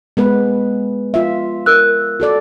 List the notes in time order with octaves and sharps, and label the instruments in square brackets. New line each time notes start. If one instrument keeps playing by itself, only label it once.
[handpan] G#3 B3 B4
F4 E5
[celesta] A#4 E6 F#6
[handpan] F#4 A4 D5